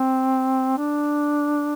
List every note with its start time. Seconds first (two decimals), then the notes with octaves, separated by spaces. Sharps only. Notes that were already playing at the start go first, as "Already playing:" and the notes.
Already playing: C4
0.78 D4